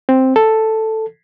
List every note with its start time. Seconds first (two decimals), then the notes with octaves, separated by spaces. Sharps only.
0.09 C4
0.36 A4